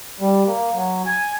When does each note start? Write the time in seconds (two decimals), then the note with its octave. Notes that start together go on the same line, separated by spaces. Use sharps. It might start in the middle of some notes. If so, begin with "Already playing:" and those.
0.20 G3
0.47 A#3
0.74 F#3
1.06 G#5